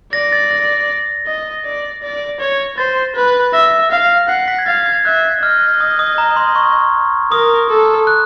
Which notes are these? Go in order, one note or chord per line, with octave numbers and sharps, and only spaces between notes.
D5 A#6
A6
A#6
D#5
D5
D5
C#5
C5 A6
B4
E5 A#6
F5
F#5 C7
B6
G#6
F5 A6
G#6
E5 F#6
D#5 F6
D#6
D#6
A#5
C6
C#6
A#4 D#6
A4
F#6